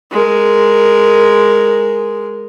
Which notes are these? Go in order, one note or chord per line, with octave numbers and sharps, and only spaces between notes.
G#3 A#4